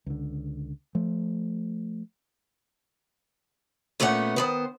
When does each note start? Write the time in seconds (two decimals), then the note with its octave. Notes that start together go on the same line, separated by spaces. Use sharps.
0.06 C#2 D3
0.95 F3 A3
4.00 A#2 A3 B3 C#4 B4 F#5
4.36 D#3 B3 C5